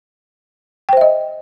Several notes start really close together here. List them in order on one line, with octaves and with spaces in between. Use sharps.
G5 C5 E5 D#5